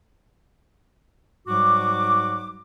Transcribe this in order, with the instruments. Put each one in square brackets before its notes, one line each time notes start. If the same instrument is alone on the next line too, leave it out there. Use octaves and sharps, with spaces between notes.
[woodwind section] G#2 F#3 G3 F#4 D6